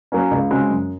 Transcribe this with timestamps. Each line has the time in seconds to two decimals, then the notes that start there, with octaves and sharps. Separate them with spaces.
0.12 F#3 A#3 C#4
0.31 C#2
0.50 C#3 G#3 C4 F#4
0.70 F#2